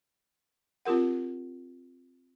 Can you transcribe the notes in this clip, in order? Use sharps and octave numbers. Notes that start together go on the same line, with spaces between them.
C4 F4 G4 A#4 F#5